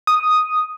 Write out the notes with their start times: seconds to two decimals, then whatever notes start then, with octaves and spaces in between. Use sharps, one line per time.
0.07 D#6